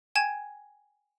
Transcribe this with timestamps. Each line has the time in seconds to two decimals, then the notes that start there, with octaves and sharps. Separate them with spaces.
0.15 G5 G#5 G#6 E7